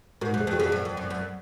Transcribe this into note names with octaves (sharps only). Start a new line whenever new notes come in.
G#2 F#4 A#4
F#2
G#4 C5
F2
F#4
F2 F4 G#4
F#2
F2
F#2
F#2